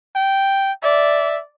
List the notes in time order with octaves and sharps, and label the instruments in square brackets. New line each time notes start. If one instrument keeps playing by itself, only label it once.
[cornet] G5
[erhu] D5 [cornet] E5